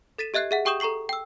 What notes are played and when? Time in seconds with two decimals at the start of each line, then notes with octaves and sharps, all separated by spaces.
0.18 A4 A6 B6 D#7 E7
0.34 G4 D#5 E5 F#6 G#6 C7
0.51 G#4 E5 F#5
0.65 G4 G5 C#6 D#6 G6 E7
0.80 A4 A#5 C#6 C7 F#7
1.09 G5 E6